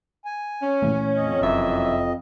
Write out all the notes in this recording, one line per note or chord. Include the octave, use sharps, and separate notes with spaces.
G#5
C#4
A#2 E3 A3
F2 D#5
F1 F#2 E3 E5